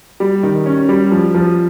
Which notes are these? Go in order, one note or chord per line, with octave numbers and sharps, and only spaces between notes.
G3
D#3
C#4
G3
F3
F3